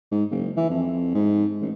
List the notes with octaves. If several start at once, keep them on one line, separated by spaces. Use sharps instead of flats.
G#2
F#1
E3
F2
G#2
A1